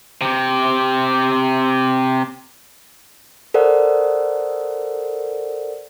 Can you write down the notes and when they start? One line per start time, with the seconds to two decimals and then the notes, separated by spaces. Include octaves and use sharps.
0.21 C3 G4
3.54 A4 A#4 C5 D5 F#5